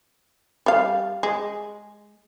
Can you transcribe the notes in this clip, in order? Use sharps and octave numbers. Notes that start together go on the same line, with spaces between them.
G3 F5
G#3